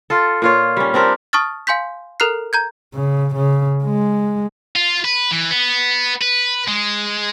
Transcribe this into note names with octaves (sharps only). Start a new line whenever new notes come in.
F4 A4
A#2 F4 C#5
G3 C#4
C4 D4 G4 A#4
A5 C#6 D#6 F6 A6
F5 G#5 C6 G6 B6
A4 A#4 A#5 F6 F#6 C7
A#5 G6 G#6
C#3
C#3
G#3
F4
B4
E3
B3
B4
G#3